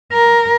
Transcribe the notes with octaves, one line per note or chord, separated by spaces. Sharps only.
A#4